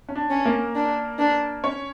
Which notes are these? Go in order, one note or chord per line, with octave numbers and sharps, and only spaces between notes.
C#4
D4
C#4
A#3 A#4
D4
D4
C#4 C#5